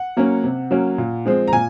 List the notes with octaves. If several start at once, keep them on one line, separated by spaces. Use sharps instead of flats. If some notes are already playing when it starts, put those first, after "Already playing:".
Already playing: F#5
F#3 A#3 C#4
C3
F#3 A#3 C#4
A#2
F3 G#3 C4
A#5
A#2 G#5